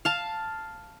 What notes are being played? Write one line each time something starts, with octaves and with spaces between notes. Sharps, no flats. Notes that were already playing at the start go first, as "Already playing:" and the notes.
F5 A5